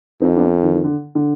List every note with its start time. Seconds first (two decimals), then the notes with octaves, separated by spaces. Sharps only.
0.21 F2 C4 D#4
0.36 B3 D4
0.63 D#3
0.74 D#3
0.84 D3
1.15 D3